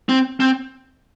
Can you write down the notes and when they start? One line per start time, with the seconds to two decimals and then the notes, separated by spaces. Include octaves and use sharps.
0.09 C4
0.40 C4